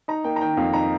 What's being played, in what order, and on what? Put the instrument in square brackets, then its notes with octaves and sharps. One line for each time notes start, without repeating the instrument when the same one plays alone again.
[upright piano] D#4 A#5
A#3 G5
A#5
D#3 G5
F2 F5
D#4 A#5